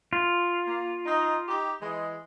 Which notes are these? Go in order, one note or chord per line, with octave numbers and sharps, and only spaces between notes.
F4
A#3
D#4
D#4 G4
E3 G#3